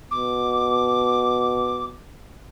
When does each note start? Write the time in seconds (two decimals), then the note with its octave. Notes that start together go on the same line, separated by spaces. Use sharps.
0.11 B2 D6